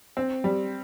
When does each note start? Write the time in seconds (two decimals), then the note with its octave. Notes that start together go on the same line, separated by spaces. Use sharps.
0.17 C4
0.44 G3